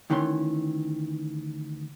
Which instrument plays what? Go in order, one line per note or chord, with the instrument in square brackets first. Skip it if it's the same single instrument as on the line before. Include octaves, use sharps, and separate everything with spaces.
[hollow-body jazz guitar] D2 D#3 E3 C#4 A#5 C6